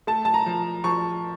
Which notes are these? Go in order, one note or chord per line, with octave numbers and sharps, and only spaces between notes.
A3 A5
A5
A#5
F3
F3 C#6